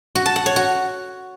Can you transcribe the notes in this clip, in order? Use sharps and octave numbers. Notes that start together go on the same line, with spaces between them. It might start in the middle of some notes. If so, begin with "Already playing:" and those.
F#4
A5
F#5
C#5
F#4